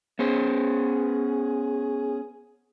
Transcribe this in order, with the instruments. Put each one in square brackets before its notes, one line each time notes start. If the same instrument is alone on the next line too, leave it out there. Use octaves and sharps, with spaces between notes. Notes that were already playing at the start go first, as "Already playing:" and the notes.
[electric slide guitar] B3 C#4 C5 [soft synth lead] G#4